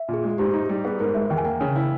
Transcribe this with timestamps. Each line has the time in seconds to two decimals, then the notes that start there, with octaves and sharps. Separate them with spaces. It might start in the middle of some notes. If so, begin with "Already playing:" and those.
Already playing: E5
0.08 A#2
0.14 G#4
0.24 G#3
0.38 G#2 G4
0.53 D#4
0.69 G3
0.85 B3 G#4
1.00 G#2 A#4
1.15 G#3 E5
1.30 E2 G5
1.38 G#5
1.45 A#3 G5
1.61 C#3
1.76 E4